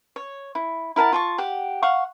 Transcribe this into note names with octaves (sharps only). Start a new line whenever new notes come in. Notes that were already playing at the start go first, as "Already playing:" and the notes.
C#5
E4
E4 A#4 F#5 A5
F4 A5 C#6
G4 F#5 D6
F5 F#5 C#6